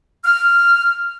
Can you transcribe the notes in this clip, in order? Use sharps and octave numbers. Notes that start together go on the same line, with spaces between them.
F6